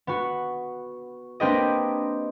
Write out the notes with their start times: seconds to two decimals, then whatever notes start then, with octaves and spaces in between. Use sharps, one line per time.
0.07 B3 F#4
1.40 A#3 C4 D4 G4 B4 D#5